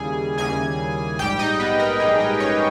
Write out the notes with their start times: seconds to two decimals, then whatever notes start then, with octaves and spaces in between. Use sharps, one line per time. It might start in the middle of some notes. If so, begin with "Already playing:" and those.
Already playing: D#2 C#3 G3 A#3 E4 G#4 G#5
0.38 D#2 C#3 G3 A#3 E4 G#4 G#5
1.19 A#1 G#2 G3 G4 G5
1.39 D#4 D#5
1.60 B3 B4
1.80 A#4
2.00 A#1 G#2 G3 G#4
2.20 A#4
2.40 C#4 C#5